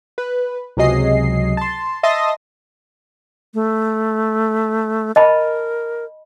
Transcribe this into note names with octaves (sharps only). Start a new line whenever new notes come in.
B4
C#2 C3 F#3 G#4 D#5 C7
A5 C6
D#5 E5 A5 C6 D#6 A#6
A3
A#4 D#5 A5 B5